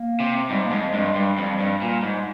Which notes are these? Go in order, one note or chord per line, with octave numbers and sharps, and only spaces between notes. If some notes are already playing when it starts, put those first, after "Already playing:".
Already playing: A#3
C3
G#2 G3
A#3
F2 G#3
G2 G#3
G2 G3
F2
G2
A#2
G#2